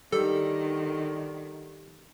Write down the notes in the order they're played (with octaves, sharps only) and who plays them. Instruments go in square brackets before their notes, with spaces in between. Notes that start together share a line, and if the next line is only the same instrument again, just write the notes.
[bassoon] D3 [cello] D#3 [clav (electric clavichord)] G3 [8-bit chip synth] A4